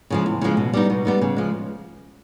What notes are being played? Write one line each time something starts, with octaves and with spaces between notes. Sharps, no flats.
C#3 F3 G#3
E2
C#3 F3 G#3
B2
G3 B3 D#4
B2
G3 B3 D#4
C#3
F3 G#3